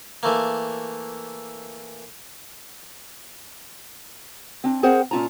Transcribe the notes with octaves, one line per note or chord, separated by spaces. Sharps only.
E3 A3 A#3
C4 D4
C4 G#4 A#4 C5 F#5 G5
A#2 C#4 F4 A5 A#5